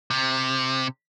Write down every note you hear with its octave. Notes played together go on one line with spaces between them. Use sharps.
C3